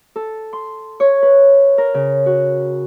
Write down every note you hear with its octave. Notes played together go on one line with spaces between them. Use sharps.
A4
C6
C#5
B4
A#4
C#3
F#4